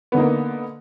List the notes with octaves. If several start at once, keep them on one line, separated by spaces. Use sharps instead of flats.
D3 A#3 B3 D#4